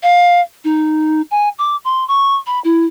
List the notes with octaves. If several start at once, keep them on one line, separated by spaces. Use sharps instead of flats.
F5
D#4
G#5
D6
C6
C#6
B5
E4